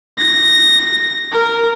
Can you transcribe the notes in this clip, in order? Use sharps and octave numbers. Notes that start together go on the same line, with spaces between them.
A#6
A#4